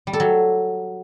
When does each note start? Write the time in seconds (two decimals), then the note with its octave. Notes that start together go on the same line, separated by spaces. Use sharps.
0.07 G3
0.13 A4
0.20 F#3